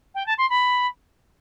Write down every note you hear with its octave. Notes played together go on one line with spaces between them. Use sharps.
G5
A5
C6
B5